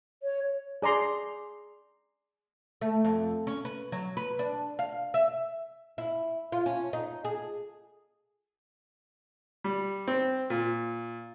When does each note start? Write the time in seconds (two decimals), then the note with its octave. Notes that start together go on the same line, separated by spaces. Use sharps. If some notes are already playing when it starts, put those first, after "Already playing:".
0.23 C#5
0.82 G#4 D5 A#5 C6
2.81 A3
3.05 F2
3.47 C#4
3.65 B4
3.92 F#3
4.17 B4
4.39 D4
4.79 F5
5.14 E5
5.98 E4
6.52 F4
6.66 C#4
6.93 D#4
7.25 G#4
9.64 G3
10.08 C4
10.50 A#2